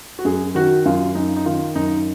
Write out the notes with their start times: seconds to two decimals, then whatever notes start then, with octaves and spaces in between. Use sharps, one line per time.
0.19 F#4
0.25 F#2 G#4
0.55 D#3 F#4
0.85 F#2 F4
1.15 F#2 D#4
1.36 D#4
1.46 D#3 F4
1.75 F#2 D#4